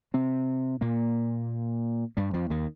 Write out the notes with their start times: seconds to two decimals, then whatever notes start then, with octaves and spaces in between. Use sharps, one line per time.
0.14 C3 C4
0.81 A#2 A#3
2.17 G2 G3
2.34 F2 F3
2.50 D#2 D#3